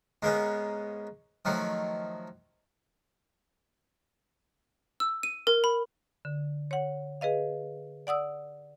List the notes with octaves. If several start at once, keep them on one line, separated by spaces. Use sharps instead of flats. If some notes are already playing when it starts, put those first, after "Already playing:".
G#2 A#3 B3 C#4
D#3 F3 F#3 A3
E6
D#7
A#4
B5
D3
C#5 F#5
G#4 B4 D#5 F5
D5 F#5 D#6 E6